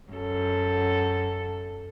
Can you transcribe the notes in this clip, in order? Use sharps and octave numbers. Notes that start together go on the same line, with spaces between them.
F#2 A4